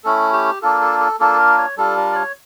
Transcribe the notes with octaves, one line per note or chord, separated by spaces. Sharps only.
A3 C#4 E4 A4
G4
A#3 D4 F4 A4
A4
A4
A#3 D4 F4 A4
A#4
C#5
G3 D4 F4 A4
A#4
D5
C#5